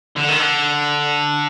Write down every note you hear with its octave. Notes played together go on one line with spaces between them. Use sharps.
D3
D#3
D3